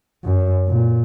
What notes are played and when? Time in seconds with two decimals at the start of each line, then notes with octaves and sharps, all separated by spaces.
0.25 F#2
0.67 A#2